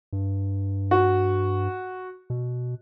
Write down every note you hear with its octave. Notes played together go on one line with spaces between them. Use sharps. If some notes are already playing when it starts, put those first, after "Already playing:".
G2
F#4
B2